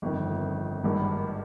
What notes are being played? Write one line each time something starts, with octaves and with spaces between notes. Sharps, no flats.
G1 F2 D#3
G#1 G2 D#3